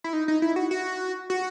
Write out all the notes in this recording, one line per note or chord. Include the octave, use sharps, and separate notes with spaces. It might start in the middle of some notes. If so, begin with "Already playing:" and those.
E4
D#4
D#4
E4
F#4
F#4
F#4